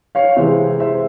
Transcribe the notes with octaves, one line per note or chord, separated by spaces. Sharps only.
C#5 F5
C3 E3 G#3 C5 E5
C5 E5